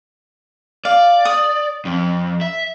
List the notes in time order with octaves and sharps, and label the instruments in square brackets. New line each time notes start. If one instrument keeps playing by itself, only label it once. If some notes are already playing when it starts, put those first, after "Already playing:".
[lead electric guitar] D5 [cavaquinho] F5
[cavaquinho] D#6
[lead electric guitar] F2
E5